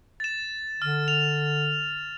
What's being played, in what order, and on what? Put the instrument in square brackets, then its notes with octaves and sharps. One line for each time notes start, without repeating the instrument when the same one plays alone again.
[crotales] A6 E7
[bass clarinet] D3 [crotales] F6
[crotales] F7